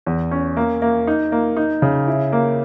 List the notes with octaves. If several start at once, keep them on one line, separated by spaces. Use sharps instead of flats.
E2
C#4
A#3
A#3
D#4
A#3
D#4
C#3
E4
A#3